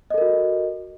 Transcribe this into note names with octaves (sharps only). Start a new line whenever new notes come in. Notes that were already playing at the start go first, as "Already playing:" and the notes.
F#4 A4 A#4 D#5